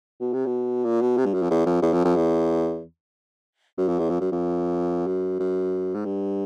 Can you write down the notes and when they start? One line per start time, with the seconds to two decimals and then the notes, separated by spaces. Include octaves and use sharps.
0.21 B2
0.34 C3
0.46 B2
0.85 A#2
1.02 B2
1.18 C3
1.25 G2
1.34 F#2
1.42 F2
1.51 E2
1.66 F2
1.82 E2
1.93 F2
2.05 F2
2.16 E2
3.78 F#2
3.88 F2
3.99 E2
4.09 F2
4.21 F#2
4.32 F2
5.07 F#2
5.40 F#2
5.95 G#2
6.05 G2